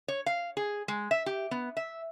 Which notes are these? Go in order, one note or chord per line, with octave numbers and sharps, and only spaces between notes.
C#5
F5
G#4
G#3
E5
G4
B3
E5